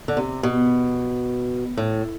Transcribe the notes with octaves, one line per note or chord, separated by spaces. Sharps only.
D3
C3
B2
A2